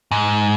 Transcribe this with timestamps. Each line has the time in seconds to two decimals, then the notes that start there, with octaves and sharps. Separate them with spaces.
0.11 G#2